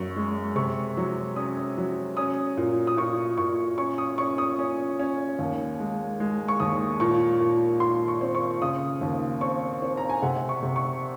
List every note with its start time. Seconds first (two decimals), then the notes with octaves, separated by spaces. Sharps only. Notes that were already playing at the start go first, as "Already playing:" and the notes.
Already playing: F#2 C#6
0.16 G#3
0.56 C3 C#6
0.97 F#3
1.36 C#4 D#6
1.77 F#3
2.17 C#4 D#6
2.57 A#2
2.87 D#6
2.97 A#2 C#6
3.38 A#2 C#6
3.78 C#4 C#6
3.98 D#6
4.18 C#4 C#6
4.38 D#6
4.59 C#4
4.99 C#4
5.39 D#2
5.80 G#3
6.20 G#3
6.48 C#6
6.60 D#2 D#6
7.00 A#2 C#6
7.40 A#2
7.80 A#2 C6
8.08 C#6
8.21 C4
8.35 C#6
8.62 C#3 D#6
9.01 D#2
9.41 C4 C#6
9.82 C4
9.97 A#5
10.10 G#5
10.22 C3 F#5
10.49 C#6
10.63 C3
10.76 C#6